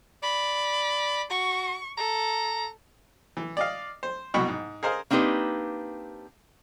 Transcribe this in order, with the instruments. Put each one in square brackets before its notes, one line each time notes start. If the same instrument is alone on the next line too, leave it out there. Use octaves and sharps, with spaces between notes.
[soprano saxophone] D5 [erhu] B5
[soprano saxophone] F#4 [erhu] C#6
[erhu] A4 [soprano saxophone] A#5
[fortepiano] E3
D5 D#5 F5
C5
C2 B2 F#4 G5 B5 C#6
G#2
G#4 A#4 C5 D#5 F5
[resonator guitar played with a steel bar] A#3 C4 D4 D#4 G4 B4